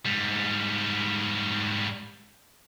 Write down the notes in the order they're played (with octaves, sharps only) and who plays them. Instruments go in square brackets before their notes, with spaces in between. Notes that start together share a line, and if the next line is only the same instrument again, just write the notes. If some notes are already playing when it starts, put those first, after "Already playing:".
[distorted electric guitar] G#2 G3